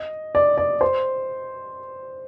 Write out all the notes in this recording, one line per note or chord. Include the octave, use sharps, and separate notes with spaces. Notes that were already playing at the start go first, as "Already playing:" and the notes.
Already playing: D#5
D5
D5
C5